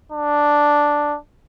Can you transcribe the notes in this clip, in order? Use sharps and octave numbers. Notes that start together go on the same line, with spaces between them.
D4